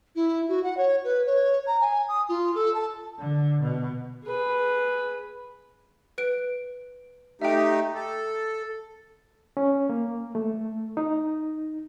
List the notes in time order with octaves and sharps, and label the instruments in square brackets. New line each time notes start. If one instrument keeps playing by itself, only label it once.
[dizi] E4
F#4
F#5
C#5
B4
C#5
A#5
G#5
D#6
F4
A4
A5
[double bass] D3
B2
[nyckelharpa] G#4 B4
[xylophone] B4 D7
[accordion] A3 D#4 G4 [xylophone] E5 G5
[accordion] A4
[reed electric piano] C#4
A#3
A3
D#4